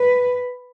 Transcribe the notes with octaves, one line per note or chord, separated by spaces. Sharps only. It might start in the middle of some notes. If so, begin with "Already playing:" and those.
Already playing: B4